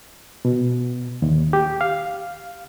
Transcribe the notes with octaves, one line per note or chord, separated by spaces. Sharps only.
B2
D#2
G4
F5